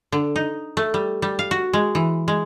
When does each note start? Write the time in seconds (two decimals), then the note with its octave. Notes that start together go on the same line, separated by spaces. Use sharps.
0.12 D3
0.36 D#4
0.77 A3
0.94 G3
1.22 G3
1.39 F5
1.51 F#4
1.73 G#3
1.95 E3
2.28 G#3